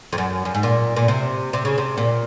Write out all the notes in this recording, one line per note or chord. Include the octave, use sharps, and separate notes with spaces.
F2
F#2
F#2
G#2
A#2
A#2
C3
C3
C#3
C3
A#2